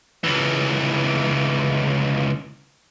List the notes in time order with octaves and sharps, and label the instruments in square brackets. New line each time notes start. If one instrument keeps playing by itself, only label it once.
[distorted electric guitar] C#2 E3